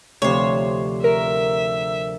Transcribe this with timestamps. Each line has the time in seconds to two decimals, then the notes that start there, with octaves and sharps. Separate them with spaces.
0.22 D2 C3 F3 C5 C#5
1.04 A#4 E5